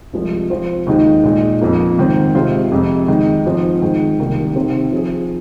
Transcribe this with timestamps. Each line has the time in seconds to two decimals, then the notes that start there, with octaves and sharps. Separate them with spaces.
0.13 C2 C3 F3 G#3
0.50 F3 C4 F4 C5
0.87 D#2 D#3 G#3 D#4
1.23 A#2 G#3 D#4
1.61 F2 F3 A#3
1.98 G#2 D#3 C4
2.35 C3 G#3 F4 C5
2.71 F2 C3 G#3
3.08 D#3 G#3 D#4
3.46 G#2 F3 G#3 C4
3.82 G#2 D#3 G#3
4.20 C2 C3 D#3 A#3
4.56 C3 D#3 C4
4.92 F3 C4 G#4 C5